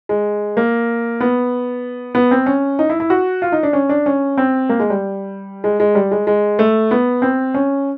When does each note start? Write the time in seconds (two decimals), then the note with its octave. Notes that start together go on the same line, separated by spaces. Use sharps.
0.09 G#3
0.57 A#3
1.20 B3
2.15 B3
2.31 C4
2.46 C#4
2.79 D#4
2.90 E4
3.00 E4
3.10 F#4
3.42 F4
3.52 D#4
3.63 D4
3.73 C#4
3.89 D4
4.06 C#4
4.37 C4
4.69 A#3
4.80 G#3
4.90 G3
5.64 G#3
5.80 G#3
5.95 G3
6.11 G#3
6.27 G#3
6.59 A3
6.91 B3
7.22 C4
7.54 C#4